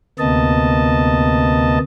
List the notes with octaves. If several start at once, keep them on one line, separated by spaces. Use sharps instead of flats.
D2 C3 A#3 B3 D#5 A5